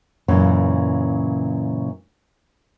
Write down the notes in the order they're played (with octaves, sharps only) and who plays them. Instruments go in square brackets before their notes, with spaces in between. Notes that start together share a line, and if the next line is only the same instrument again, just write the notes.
[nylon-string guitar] F#2 A#2 C#3 E3 C#4